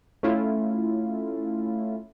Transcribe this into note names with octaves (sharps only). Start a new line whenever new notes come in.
A3 C#4 E4 F4